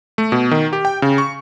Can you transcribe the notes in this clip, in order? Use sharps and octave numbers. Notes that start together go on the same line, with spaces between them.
A3
B2
D#3
G4
G5
C#3
C#6